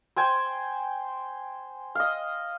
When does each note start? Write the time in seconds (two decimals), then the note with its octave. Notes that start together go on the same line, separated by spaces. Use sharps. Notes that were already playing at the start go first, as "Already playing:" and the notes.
0.16 C5 G5 G#5
1.95 D#5 F5